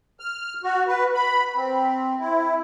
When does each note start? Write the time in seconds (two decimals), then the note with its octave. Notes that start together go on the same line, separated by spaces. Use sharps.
0.20 F6
0.64 F#4
0.88 B4
1.15 B5
1.56 C4
2.20 E4